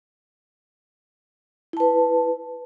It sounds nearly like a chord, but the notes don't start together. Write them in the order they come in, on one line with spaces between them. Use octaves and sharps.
E4 A5 B4